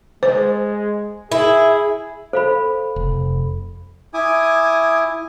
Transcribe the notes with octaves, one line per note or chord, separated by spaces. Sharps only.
G#3 C5
E4 G#4
A4 C5 F5 B5
F1
E4 G#5 D6 D#6